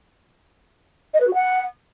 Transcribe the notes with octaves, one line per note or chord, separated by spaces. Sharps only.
D#5
B4
F#4
F#5